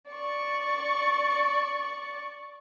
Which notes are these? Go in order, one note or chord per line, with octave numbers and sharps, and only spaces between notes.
D5 C#6